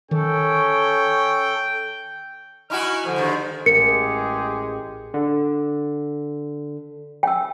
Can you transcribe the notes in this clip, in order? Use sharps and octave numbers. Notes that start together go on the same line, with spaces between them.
D#3 C#4 A4 G5
D#4 E4 F#4 G#5 C#6 F6
D3 F3
G2 D#3
A1 G#3 G4 G#4 A#4 C#7
D3
G5 E6